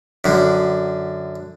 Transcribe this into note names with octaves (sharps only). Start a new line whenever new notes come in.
F#2 D3